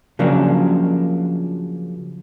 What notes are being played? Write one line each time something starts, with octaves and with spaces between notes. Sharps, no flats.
C#3 F3 F#3 A#3 D4